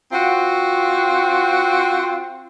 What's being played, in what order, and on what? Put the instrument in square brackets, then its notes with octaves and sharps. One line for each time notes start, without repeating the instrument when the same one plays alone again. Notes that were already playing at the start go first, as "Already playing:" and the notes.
[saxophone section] C4 F4 F#4